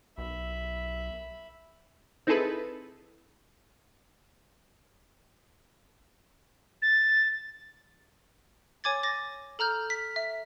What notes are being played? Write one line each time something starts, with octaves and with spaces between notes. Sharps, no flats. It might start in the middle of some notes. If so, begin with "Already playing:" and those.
B1 E5 B5
C4 D#4 E4 G#4 A4 B4
A6
C#5 G#5 D6 G#6 A6
D6 A6 A#6
A4 A#5 F6 G6
B6
E5